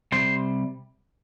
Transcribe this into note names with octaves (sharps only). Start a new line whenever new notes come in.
C3 G3 C5